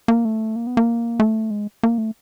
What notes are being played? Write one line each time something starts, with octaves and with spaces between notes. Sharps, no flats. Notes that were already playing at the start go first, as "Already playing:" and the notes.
A#3
A3
A#3
B3
A#3
A3
G#3
A#3
A3